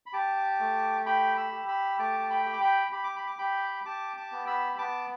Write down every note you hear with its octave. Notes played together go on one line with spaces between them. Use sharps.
B5
G4 A5 D6
A3
G4 G5 B5
B5 E6
G4
B5 E6
A3 A5 D6
A5
G5 B5
G4
D6
G5 B5
G4 B5
D6
B5
D6
G4 G5 B5
G4 A5 D6
A5 D6
B3
B5 E6
B5
B3 A5 D6